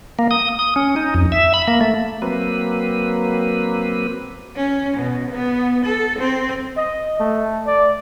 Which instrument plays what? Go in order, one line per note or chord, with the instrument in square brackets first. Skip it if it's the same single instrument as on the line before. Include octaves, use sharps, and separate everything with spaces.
[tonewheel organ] A#3
D#6
D#6
C#4
D#4
F2
E5
B5
A#3
A3
F#3 A#3 C4 B4
[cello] C#4
B2
B3
A4
C4
[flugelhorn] D#5
A3
D5